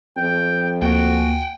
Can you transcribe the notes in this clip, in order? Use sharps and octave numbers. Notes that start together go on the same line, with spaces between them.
F2 G5
D2 A#3 F#4 F#5 G5